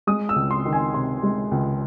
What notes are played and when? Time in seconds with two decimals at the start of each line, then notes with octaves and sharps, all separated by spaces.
0.07 G#3 D#6
0.29 E6
0.36 C#2
0.51 C6
0.65 D#3
0.73 G#5
0.94 C3 C6
1.23 G#3
1.51 C#2